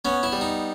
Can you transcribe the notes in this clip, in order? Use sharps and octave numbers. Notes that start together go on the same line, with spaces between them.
B3 C#4
E4
G3
D#4